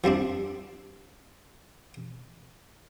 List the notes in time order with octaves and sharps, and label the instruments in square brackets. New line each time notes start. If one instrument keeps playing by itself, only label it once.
[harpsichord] F3 G3 C4 D4